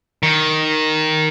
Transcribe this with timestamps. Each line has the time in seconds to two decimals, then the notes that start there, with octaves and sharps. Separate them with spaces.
0.23 D#3